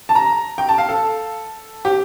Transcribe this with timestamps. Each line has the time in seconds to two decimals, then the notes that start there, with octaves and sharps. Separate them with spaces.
0.09 A5
0.15 A#5
0.58 G5
0.69 A5
0.78 F5
0.89 A4
1.85 G4